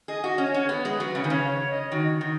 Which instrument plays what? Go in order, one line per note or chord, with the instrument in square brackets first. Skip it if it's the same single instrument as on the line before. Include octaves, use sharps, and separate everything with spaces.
[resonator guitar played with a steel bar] G#4 [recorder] D#5
[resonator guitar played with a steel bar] F#4
[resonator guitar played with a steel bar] C#4 [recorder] C#5
[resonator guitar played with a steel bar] C#4
[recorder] G#4
[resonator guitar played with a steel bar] B3 [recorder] B4
[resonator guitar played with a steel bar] G#3 [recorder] B4
[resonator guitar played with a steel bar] F#3
[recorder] B4
[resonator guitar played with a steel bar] C#3
D#3
[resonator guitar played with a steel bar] C#3 [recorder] C#5
[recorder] C#5
D#5
[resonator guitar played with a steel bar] D#3 [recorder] F#4
[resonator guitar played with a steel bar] D#3